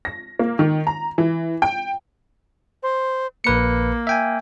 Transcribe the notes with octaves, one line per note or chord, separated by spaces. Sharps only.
A#6
A#3
D#3
A#5
E3
G5
C5
A#1 A#3 B4 C#7
E5 G5 G#5